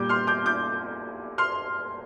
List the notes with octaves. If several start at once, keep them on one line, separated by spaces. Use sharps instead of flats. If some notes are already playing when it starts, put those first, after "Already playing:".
Already playing: A#2 G3 D6 G6
C6 F6
D6 G6
D6 G6
C6 F6